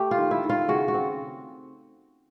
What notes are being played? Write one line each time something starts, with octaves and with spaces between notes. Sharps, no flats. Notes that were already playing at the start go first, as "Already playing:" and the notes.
Already playing: A3 G4
F4
D#3
E4
D#3
F4
C#3 F#4
F#4
C4